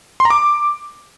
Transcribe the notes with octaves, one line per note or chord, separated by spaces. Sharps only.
C6
A#5
D6